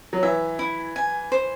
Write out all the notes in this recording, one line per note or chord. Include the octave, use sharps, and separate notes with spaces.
F#3
E3 E5
E4
G#5
C5